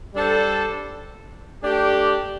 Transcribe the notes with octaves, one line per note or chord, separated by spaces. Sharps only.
G3 D4 A4 C5
A3 D4 G4